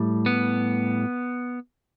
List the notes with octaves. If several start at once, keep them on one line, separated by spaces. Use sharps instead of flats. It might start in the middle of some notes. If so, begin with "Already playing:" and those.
Already playing: A2 G3
B3